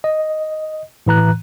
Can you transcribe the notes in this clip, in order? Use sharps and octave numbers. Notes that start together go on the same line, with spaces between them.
D#5
A2 E3 A#5 F#6